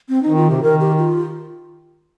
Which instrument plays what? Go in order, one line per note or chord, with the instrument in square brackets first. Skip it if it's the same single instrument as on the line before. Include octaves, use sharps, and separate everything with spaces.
[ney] C4
D#4
[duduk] D#3
[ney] F4
[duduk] C3 [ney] G4
[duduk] D#3 [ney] A#4
[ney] G4
F4